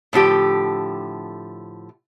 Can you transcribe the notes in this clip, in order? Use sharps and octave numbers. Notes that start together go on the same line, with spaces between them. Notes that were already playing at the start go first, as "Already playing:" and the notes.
A2 D3 F3 G4